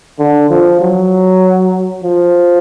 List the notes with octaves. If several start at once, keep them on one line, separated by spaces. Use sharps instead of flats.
D3
F3
F#3
F3